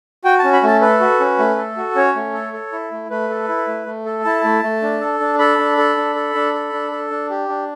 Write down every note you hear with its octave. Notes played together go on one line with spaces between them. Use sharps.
F#4 G5
C#4 A5
B5
A3 A5
A4 B4
F#4
C#4
A3
A4
F#4
C#4 C#5
A3
A4
A4
E4
A3
A3 B4
A4
E4
A3
A3
A4
E4 A5
A3
A3
D4
A4
D4
A4 B5
D4
A4
D4
A4
D4
A4
D4
A4
D4
G4
D4